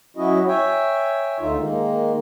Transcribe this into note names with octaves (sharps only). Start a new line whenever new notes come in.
F#3 C#4 E4 F#4 D#5
C#5 E5 G5 G#5
D2 D3 D#4 F4 E5
D#3 G#3 A#3